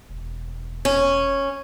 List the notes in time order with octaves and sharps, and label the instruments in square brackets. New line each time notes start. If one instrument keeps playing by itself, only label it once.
[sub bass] E1
[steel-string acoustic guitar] C#4